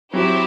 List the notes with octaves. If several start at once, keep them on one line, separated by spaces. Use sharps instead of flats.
F#3 C4 E4 G4